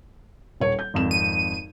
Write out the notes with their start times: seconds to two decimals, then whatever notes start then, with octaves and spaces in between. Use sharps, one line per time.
0.60 D#1 C#5
0.79 G6
0.94 G#1 F2 E7
1.11 D#7